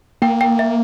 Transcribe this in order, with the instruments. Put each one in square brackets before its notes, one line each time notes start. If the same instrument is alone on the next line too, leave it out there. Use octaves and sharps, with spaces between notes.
[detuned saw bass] A#3 [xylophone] G5
[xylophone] G5
E5